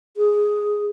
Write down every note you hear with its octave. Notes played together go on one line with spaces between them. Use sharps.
G#4